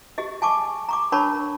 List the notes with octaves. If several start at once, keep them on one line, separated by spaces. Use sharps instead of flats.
G4 G#4 D#5
G#5 A5 C#6 D6
A#5 C#6 D6
D4 A#4 C#5 A5 B5 C#6